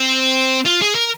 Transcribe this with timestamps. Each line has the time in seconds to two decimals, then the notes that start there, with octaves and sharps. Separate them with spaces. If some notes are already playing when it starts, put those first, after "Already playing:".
Already playing: C4
0.66 F4
0.82 G#4
0.95 A#4